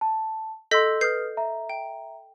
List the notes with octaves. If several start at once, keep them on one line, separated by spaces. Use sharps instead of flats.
A5
A4 D#5 C6 E6 G6 B6
B4 D#6 F6 G6 C7
E5 A#5
G5